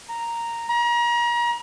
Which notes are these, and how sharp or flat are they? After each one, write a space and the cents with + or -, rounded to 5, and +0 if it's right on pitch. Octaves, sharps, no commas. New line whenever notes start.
A#5 -5
A#5 +35